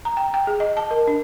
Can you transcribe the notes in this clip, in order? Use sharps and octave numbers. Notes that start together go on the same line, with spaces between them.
A#5
G5
G5
G#4
D#5
A5
A#4
D4